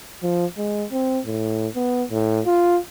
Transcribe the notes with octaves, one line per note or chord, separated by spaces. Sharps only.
F3
G#3
C4
A2
B3
A2
F4